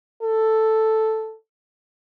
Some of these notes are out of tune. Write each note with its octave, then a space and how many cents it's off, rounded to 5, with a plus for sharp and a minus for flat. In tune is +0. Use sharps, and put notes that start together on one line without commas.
A4 +0